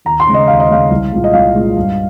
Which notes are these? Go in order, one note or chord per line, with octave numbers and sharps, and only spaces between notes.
D#2 A#5
C6
C#3 G#3
D#5
D#2 F5
D#5
C#3 G#3 F5
C2
A#2 G#3
D#5
C2 F5
A#2 G#3
G2